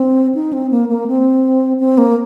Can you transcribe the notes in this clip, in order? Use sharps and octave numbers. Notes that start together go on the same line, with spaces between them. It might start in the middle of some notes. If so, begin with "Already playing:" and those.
Already playing: C4
D#4
C4
A#3
A#3
C4
C4
A#3